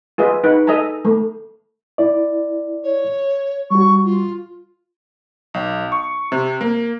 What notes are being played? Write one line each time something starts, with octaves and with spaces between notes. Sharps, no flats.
F4 G#4 B4 D#5 E5
D#4 B4 F#5
A4 D#5 E5 G#5 A#5
A3
E4 D5
C#5
G3 F#4 C#6
F4
B1
C#6
C3
A#3